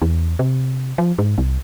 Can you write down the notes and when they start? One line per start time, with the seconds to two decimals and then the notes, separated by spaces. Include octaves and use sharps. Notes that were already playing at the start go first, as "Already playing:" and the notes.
0.02 E2
0.39 C3
0.98 F3
1.18 G#2
1.38 C2